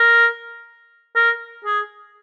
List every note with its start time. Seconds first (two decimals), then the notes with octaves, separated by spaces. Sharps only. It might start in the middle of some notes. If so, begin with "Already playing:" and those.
Already playing: A#4
1.15 A#4
1.65 G#4